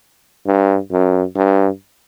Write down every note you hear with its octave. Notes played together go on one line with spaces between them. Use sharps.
G2
F#2
G2